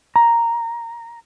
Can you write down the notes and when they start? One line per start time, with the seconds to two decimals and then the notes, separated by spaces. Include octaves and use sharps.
0.16 A#5